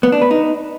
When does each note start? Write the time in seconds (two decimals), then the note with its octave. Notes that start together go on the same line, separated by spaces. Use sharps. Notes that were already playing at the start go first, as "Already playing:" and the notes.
0.03 B3
0.12 D4
0.22 B4
0.31 D#4